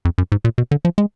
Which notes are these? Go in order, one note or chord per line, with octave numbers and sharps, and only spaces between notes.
F2
F#2
G#2
A#2
B2
D3
F3
G#3